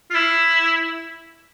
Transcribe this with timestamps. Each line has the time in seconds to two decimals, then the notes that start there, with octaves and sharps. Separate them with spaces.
0.10 F4
0.14 E4